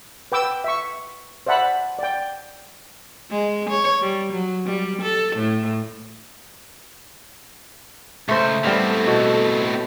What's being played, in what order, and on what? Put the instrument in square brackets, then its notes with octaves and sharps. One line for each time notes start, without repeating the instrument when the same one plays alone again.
[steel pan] B4 G5 D6 E6
E5 C#6
C5 D5 E5 F#5 A5 B5
D5 G5
[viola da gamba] G#3
C#5
G3
F#3
G3
A4
A2
[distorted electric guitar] C#2 [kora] A3 C5
[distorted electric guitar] A2 C4 [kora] G3 B3 F5 [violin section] A4
[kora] B2